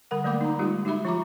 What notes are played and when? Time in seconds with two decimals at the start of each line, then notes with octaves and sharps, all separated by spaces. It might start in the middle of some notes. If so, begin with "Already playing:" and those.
0.11 D3 G3 A#4 F#5
0.24 D3 F#3 A3 A#3 B5 D6
0.41 D#4 A#5
0.59 G3 G#3 D#4 F4 G4
0.85 D#4 F#4 G4 E5 B5
1.05 F3 F4 E5 A#5 C#6 D6